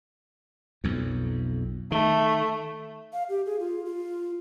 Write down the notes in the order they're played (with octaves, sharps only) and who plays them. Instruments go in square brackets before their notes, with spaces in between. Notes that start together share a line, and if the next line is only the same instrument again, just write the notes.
[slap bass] B1 F2
[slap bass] D#3 [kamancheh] A3
[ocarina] F5
G4
G#4
F4
F4